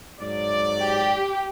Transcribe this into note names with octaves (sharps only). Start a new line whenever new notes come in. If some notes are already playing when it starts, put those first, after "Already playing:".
G#2 F#3 D5
G4